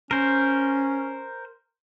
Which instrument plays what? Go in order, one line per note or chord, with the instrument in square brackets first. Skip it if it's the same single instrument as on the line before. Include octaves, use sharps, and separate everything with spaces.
[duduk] C#4 [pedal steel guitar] A#4 C5